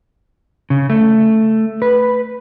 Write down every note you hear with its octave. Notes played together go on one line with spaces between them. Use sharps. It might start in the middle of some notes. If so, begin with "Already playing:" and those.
C#3
A3
B4